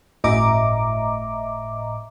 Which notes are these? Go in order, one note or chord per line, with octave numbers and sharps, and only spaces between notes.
G1 A2 D#5 E5 A#5 D6